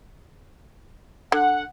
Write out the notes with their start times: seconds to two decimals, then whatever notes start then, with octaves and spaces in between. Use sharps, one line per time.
1.32 D3 F#5